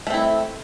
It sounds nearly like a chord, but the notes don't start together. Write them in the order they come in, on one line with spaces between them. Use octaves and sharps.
A3 C4 E4